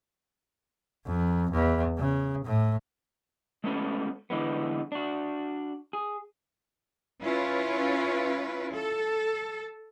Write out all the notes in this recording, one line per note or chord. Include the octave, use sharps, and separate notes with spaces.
F2
E2
C#3
A2
G#3 A3 B3 C#4 A4
D3 E3 G#3 B3
D4 F#4
G#4
C#4 E4 F4 B4
A4